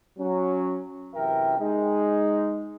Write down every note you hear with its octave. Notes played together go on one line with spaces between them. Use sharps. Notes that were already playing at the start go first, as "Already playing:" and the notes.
F#3 C#4
F#2 C3 E3 A#4 E5 G5
G#3 D#4